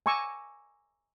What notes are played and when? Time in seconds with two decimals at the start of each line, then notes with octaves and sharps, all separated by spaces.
0.06 G#5 A#5 C#6 D6 E6